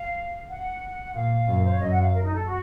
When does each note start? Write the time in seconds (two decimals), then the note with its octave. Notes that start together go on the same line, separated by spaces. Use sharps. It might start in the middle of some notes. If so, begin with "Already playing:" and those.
Already playing: F5
0.48 F#5
1.14 A#2 F5
1.47 F#2
1.55 A#4
1.64 C5
1.71 C#5
1.79 F#2 D#5
1.91 F#5
2.01 F5
2.12 A#4
2.23 D#4
2.34 A4
2.46 F#4